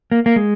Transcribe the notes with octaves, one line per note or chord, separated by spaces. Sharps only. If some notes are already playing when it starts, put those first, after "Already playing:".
A#3
A#3
G#3